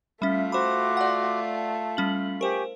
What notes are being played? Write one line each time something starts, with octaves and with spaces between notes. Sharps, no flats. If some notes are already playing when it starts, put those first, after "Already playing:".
G3 A3 C#4 F4 E5
F#4 C5 B5 C6 D6
D5 F#5
A5
G3 C#4 F#7
G4 A#4 C5 G#5 C#6